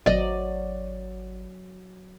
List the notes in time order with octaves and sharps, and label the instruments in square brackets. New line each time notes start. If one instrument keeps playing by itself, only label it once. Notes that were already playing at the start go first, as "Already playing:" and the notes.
[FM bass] G#1 [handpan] F#3 [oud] D5 D#5